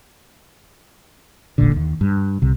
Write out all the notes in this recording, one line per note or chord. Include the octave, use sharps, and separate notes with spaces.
D1 A1 A#2 D3
D#2
G2
C2 C3